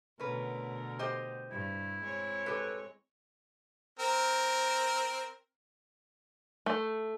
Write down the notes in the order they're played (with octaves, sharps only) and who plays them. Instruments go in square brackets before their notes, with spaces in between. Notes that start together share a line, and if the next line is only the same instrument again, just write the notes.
[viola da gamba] B2 D3 A3 [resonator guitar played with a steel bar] C#4 B4 [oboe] A#4
[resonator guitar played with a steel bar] G4 C5 D#5
[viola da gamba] G2 [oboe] E4
[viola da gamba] G#3 C4 C#5
[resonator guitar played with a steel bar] G4 A4 B4
[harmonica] C4 A#4
[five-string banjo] A3